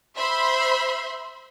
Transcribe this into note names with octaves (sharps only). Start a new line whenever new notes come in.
C5 E5 B5 C6